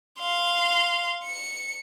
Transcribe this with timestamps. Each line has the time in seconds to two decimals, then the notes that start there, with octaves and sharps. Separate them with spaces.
0.19 F5 C6
1.24 C#7